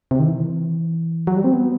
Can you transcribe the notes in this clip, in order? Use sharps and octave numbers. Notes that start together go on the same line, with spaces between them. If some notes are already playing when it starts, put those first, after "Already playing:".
C3
D#3
E3
F#3
G3
C4
B3